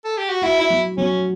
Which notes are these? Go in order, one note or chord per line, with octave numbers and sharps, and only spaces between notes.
A4
G4
F#4
E4 F#4
E4
F#3
F#3 C#4